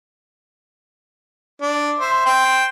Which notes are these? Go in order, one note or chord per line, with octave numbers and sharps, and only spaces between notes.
D4
C5 E5
C5 G5